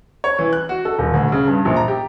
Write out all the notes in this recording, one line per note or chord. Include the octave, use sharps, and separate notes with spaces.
C#5
E3
F#6
F#4
A4
D#1
D2
C#3
G2
A#1
A#5
G4